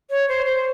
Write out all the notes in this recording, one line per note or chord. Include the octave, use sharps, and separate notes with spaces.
C#5
C5
C5